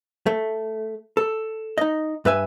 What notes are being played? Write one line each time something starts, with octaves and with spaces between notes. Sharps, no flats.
A3
A4
D#4 D#5
G2 B4 E5 G#5